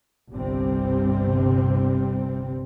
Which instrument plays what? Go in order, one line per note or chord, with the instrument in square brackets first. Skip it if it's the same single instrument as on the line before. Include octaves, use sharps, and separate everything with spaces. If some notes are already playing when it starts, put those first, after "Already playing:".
[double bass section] G1 C2 G2 C3 G3 C4